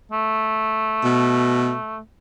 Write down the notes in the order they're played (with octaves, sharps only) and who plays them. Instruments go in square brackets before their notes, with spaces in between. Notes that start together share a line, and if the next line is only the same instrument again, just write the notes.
[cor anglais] A3
[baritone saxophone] B2